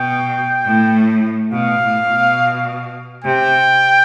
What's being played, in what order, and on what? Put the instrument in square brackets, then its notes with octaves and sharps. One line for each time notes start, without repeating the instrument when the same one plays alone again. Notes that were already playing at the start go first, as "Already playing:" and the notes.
Already playing: [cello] B2 [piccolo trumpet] G5
[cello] A2
[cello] B2 [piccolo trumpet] F5
[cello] A2
B2
[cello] C3 [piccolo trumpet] G5